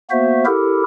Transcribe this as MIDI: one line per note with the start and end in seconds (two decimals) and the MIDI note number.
0.11 0.44 58
0.11 0.44 59
0.11 0.44 66
0.11 0.44 72
0.11 0.44 76
0.45 0.83 64
0.45 0.83 67
0.45 0.83 69
0.45 0.83 70